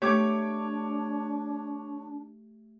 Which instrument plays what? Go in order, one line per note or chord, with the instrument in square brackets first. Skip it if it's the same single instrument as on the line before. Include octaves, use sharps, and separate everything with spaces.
[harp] A3 G4 [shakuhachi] D4 [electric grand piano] C#5 D6 G#6